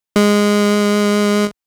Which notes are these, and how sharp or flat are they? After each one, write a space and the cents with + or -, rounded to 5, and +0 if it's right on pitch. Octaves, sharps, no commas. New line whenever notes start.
G#3 -10